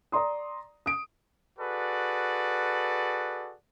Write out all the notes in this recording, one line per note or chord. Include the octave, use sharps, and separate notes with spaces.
D5 A#5 C6 D#6
D#6 D7
F#4 G#4 A4 B4 D5